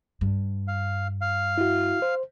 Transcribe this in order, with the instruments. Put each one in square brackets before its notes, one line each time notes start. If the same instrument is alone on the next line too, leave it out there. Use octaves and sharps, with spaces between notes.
[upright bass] G2
[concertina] F5
F5
[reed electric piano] E4 F#4
C5